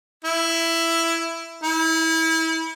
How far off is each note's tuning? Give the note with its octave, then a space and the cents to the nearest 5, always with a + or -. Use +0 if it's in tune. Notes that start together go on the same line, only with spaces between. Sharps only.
E4 +10
E4 -30